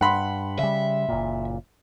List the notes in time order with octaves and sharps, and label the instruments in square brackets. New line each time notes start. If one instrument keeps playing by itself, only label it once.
[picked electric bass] G2 [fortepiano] F#5 B5 C6
[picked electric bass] C#3 G3 [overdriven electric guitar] E5
[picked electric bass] F#1 A#2